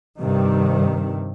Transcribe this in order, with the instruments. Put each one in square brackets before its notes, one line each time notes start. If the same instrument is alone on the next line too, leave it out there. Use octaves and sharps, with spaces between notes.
[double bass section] G2 C3 D#3